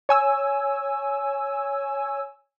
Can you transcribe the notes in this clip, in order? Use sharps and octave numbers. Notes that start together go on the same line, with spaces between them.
C#5 G#5 E6